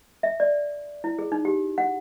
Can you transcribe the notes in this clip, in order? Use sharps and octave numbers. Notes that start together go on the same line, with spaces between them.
E5
D5
E4
G#4
D#4
G4
F#5